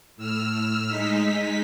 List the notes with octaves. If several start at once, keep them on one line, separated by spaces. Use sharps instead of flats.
A2 E6 F6
G#3 D#4 B6